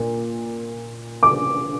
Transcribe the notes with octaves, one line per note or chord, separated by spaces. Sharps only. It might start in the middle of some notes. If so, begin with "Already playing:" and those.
Already playing: A#2
D6